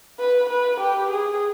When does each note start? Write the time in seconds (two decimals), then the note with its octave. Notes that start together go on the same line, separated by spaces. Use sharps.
0.20 B4
0.50 B4
0.80 G4
1.11 G#4